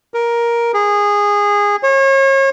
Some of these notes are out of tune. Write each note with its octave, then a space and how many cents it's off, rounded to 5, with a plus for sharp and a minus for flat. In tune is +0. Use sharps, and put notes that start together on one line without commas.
A#4 +10
G#4 -20
C#5 -35